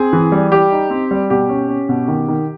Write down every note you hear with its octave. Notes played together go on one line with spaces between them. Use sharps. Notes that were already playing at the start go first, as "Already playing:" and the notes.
Already playing: C4 G#4
E3
G3
G3 G4
D#4
C4
G3
B2 G4
C#4
C#4
B2
D#3
D#3